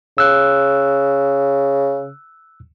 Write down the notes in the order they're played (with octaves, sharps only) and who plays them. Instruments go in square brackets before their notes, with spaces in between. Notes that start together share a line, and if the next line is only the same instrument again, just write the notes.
[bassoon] C#3 [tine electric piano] E6 F#6